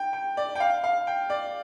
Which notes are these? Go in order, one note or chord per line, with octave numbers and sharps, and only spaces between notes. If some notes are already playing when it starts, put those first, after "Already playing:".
Already playing: G5
G5
D5
G5
F5
F5
G5
D5